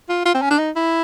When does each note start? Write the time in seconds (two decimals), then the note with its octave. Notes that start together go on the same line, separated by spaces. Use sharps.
0.09 F4
0.26 F4
0.35 C4
0.42 C#4
0.50 D4
0.59 D#4
0.76 E4